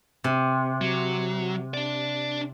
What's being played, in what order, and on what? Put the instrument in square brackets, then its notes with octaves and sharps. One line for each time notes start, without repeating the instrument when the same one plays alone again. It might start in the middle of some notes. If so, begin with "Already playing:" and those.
[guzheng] C3
[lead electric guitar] F#3
D4 D5